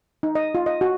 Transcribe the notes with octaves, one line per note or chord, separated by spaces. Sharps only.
D#4
D#5
F4
D#5
F#4